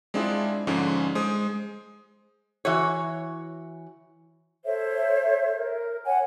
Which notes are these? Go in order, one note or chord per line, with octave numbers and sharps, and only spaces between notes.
G#3 C4 D4 E4 F4 G#4
G#2 D3 F3 G#3 C#4 D4
G#3 C5 D#6
E3 F#4 C#5
A4 C5 C#5 E5
A#4
C#5 F#5 G#5